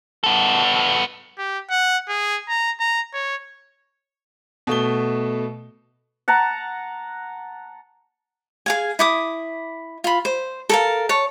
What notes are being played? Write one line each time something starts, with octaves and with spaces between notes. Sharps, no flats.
B3 A4
G4
F#5
G#4
A#5
A#5
C#5
B2 A3 G7
F#5 A5 A#5
G#4 F5 G#5
E4 D6 D#6
F4 B5
C5
A4 A#4 F5
C#5 A5